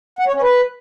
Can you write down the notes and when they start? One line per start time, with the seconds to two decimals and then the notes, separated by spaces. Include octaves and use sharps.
0.19 F#5
0.27 C#5
0.34 C#4
0.42 B4